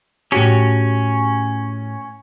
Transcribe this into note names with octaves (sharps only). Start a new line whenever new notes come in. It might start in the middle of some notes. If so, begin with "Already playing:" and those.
A2 C#4 F#4 G4